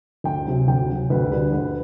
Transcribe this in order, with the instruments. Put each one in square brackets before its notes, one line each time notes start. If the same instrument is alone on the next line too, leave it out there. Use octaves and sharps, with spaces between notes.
[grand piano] D2 G5
C3 F#3
D2 G5
C3 F#3
D2 B4
D3 G3 B4
D2 B4